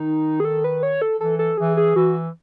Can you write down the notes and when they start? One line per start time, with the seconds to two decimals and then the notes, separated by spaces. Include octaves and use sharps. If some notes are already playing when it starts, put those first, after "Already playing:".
Already playing: D#3 D#4
0.40 G#4
0.45 A4
0.64 B4
0.83 C#5
1.02 A4
1.20 E3 A4
1.39 A4
1.58 E3 G#4
1.77 G#4
1.96 E3 F#4